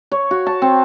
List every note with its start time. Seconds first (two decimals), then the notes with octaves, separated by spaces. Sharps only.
0.12 C#5
0.31 F#4
0.47 A5
0.62 C4